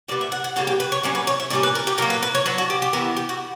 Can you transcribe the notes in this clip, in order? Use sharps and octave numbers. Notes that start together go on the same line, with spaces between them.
A#2 G3 B3 D5
E5
F#5
F#5
C#3 G3 A#3 G4
G4
B4
C#5
A#2 F#3 C#4 D5
B4
C#5
E5
A#2 G3 C#4 D5
B4
A#4
G4
A#2 F#3 A#3 A#4
B4
B4
C#5
F#3 B3 D4 B4
F#4
G4
G4
E3 B3 E4 A#4
G4
F#4